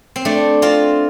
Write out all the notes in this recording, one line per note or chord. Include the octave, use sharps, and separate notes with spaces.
C4
A3 D4
C4 F4